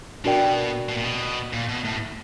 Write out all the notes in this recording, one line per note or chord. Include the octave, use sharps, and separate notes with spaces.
B2 D4 F#4 A#4 D5 G5
B2
A#2
B2
A#2
B2
A2